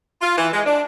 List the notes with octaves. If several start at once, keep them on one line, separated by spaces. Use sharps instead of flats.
F4
E3
G#3
D4